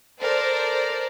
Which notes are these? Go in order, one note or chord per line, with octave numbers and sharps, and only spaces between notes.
A4 A#4 C5 D5